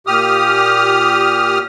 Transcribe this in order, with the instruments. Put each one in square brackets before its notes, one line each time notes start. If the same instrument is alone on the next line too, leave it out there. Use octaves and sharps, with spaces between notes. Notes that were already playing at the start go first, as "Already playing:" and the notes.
[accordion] A#2 G4 D#6 F6